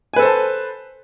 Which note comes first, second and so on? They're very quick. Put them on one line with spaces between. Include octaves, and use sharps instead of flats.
G#5 B4 A4 C5 A5